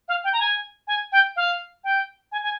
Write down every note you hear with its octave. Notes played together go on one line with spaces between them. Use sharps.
F5
G5
A#5
G#5
G#5
G5
F5
G5
G#5
G#5